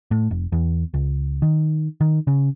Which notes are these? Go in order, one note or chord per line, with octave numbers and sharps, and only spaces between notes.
A2
F1
E2
C#2
D#3
D#3
C#3